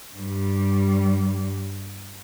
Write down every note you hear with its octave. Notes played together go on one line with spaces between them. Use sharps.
G2 G3